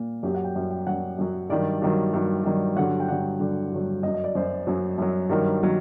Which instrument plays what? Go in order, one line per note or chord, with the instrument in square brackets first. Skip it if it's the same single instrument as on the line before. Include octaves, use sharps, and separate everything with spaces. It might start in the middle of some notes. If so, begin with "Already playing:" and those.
Already playing: [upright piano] A#2
F#2 F#3 G4
F#5
G5
F#2 F#3
G5
F#2 F#3 F#5
F#2 F#3
G2 D#3 F#3 D5
G2 D#3 F#3
G2 D#3 F#3
G2 D#3 F#3
G2 D3 F#3 F#5
G5
G2 D3 F#3 F#5
G2 D3 F#3
G2 D3 F#3
F#2 D#5
F#3
D#5
D5
F#2 F#3 C5
F#2 F#3
F#2 F#3
G2 D#3 F#3 A#4
D#3 F#3